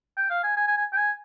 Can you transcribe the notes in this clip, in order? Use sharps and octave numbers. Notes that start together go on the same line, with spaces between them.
G5
F5
G#5
G#5
G#5
G#5
G5
G#5